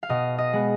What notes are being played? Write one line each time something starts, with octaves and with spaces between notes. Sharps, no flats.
F5
B2 D#5
D#5
G#3 B3